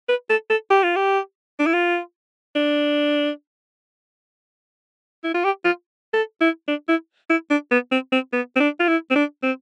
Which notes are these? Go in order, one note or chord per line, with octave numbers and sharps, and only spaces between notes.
B4
A4
A4
G4
F4
G4
D4
E4
F4
D4
E4
F4
G4
F4
A4
E4
D4
E4
E4
D4
B3
C4
C4
B3
C4
D4
F4
E4
C4
D4
C4